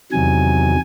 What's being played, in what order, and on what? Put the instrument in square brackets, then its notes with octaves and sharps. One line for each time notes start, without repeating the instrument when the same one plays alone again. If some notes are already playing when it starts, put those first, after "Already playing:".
[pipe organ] E2 C3 D#3 F#3 G#5